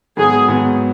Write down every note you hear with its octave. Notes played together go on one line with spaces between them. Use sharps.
G#2 D#3 F#3 B3 G#4
G#2 D#3 F#3 B3